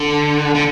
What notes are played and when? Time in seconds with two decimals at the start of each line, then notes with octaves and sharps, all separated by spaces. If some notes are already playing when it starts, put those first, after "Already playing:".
Already playing: D3
0.55 D3